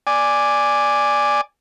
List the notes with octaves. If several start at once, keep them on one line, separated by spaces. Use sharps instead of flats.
D5 G#5